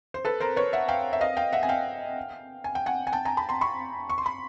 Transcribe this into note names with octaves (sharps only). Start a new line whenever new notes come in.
C5
A4 B4
A#4 C5
B4 C#5
E5 F#5
F5 G5
E5
D#5 F5
F5 G5
E5 F#5
G#5
F5 G5
G#5
G5
F#5 G#5
G#5
G5 A5
G#5 A#5
A5 B5
A#5 C6
B5 C#6
C#6
C6
B5